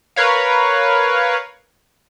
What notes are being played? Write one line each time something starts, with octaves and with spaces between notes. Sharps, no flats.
A#4 B4 C#5 F5